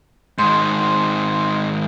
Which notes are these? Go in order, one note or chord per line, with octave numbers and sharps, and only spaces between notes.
G#2 D#3 C6